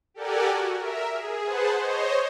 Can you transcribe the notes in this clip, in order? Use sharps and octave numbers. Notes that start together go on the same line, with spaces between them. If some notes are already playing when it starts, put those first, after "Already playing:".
G4 A4 A#4 D5 F#5 G#5
F#4
A#4 E5
G#4
G#4 B4 C5 F#5 A5
C5 C#5 D#5